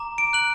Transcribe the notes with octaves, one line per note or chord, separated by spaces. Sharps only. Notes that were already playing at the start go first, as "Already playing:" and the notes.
Already playing: A#5 D6
D7
F#6 F#7